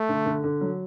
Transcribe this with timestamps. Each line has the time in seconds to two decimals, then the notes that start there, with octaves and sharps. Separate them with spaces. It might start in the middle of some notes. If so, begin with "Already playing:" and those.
Already playing: A3
0.09 D3
0.26 D3
0.44 D3
0.61 F#3